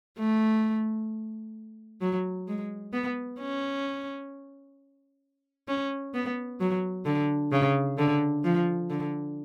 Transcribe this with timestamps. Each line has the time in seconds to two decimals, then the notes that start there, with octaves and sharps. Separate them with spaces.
0.18 A3
2.01 F#3
2.48 G#3
2.93 B3
3.40 C#4
5.68 C#4
6.14 B3
6.60 F#3
7.06 D3
7.52 C#3
7.98 D3
8.44 F3
8.90 D3